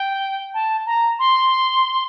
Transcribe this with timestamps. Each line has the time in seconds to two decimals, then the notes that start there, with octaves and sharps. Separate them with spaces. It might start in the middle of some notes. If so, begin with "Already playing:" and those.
Already playing: G5
0.54 A5
0.86 A#5
1.19 C6